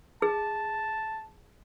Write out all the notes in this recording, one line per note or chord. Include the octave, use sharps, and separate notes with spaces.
G#4 A5